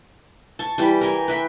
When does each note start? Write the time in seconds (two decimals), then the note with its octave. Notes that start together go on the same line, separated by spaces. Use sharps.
0.59 A5 C#6
0.78 E3 G3 G4 G5
1.01 A#4 G5 G#5
1.28 B4 E5 G5